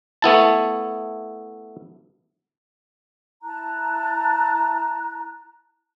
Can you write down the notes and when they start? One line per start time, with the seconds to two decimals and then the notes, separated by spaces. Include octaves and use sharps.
0.22 A3 B3 E4 A5
3.42 E4 A5 A#5 F#6